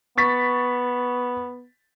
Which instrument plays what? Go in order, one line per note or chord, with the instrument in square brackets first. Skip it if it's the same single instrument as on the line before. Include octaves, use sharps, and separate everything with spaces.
[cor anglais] B3 [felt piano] C#6 A6 B6